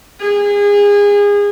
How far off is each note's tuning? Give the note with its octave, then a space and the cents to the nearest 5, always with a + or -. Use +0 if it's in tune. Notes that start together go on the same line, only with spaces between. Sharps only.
G#4 -30